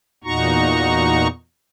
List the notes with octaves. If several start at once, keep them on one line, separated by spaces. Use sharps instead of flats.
E2 A#2 D#4 F#4 A#5 C#6